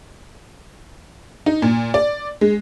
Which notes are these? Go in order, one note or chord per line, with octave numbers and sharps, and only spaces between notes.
D#4
A#2
D5
G#3